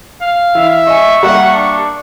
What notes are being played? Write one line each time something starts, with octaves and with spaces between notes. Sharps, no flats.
F5
E3 E5
D#5 G#5 C#6
G3 A#3 E5 F#5
D4